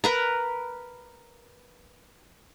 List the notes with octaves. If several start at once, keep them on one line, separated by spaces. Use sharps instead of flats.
A#4 B4 A#5